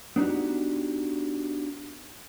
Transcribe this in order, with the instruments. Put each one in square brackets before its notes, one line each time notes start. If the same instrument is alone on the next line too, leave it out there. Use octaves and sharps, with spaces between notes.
[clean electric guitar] B3 D4 D#4 F#4 G4